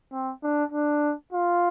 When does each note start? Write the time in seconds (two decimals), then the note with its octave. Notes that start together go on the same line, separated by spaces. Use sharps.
0.12 C4
0.43 D4
0.72 D4
1.33 F4